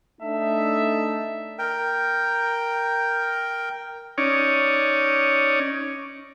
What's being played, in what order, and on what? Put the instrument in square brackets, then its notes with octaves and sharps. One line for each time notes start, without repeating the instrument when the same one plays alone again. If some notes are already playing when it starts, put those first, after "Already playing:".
[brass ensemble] A3 D4 D#4 E5 A5
[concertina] A#4 G5
[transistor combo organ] C#4 D#4 C#5 D5